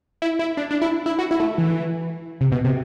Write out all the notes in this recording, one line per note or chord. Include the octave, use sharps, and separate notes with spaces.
E4
E4
D4
D4
E4
E4
F#4
E4
A3
E3
C3
B2
C3